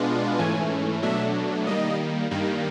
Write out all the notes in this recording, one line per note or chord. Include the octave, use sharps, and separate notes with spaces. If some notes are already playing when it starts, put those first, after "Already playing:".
Already playing: B2 G#3 B3 D4 F4
G#2 E3 A3 C#4 G#5
B2 F#3 A3 D4 E5
D#3 G3 A#3 D#5
G2 D#3 G3 A#3